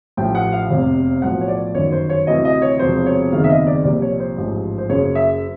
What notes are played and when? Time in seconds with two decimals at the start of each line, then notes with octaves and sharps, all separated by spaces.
0.17 A1 A2 F3 G5
0.35 F#5
0.52 F5
0.70 F1 E2 C3
1.22 B1 A2 F3 F#5
1.34 C5
1.41 C#5
1.48 D5
1.75 G1 F#2 D#3 C#5
1.92 C5
2.10 C#5
2.27 D2 C3 E3 D#5
2.45 D#5
2.62 C#5
2.79 E1 E2 C3 F3 C5
3.06 C#5
3.32 F#1 E2 C3 D#3 F5
3.44 E5
3.49 D#5
3.67 D5
3.85 C2 A#2 F3 D5
4.02 C#5
4.20 C5
4.37 A1 G#2 F3
4.78 C5
4.89 F#1 F#2 C#3 C#5
5.15 E5